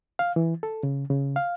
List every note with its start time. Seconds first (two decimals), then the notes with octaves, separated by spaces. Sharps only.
0.19 F5
0.36 E3
0.63 A4
0.83 C#3
1.10 C#3
1.36 F5